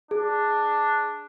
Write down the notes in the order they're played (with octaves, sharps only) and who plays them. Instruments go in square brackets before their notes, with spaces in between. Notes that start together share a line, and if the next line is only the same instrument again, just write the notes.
[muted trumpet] D4 [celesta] G#4